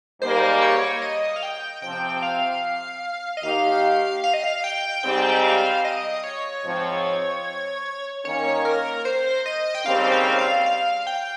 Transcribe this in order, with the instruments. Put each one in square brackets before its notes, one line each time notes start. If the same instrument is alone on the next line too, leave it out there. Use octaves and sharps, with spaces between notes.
[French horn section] G#2 G3 A#3 [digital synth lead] C5
[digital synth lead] C#5
D#5
F5
G5
[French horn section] C3 F3 C4 [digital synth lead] G5
[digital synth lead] F5
D#5
[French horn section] D#2 D#3 A#3 D#4 G4 [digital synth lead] F5
[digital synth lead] F5
D#5
F5
G5
[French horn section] G#2 G3 C4 [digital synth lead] G5
[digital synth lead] F5
D#5
C#5
[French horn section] G#2 F3 C4
[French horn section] D#3 A#3 C#4 [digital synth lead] C#5
[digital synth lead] A#4
C5
D#5
G5
[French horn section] D#2 C#3 G3 C4 [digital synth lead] F5
[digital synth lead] F5
F5
F5
G5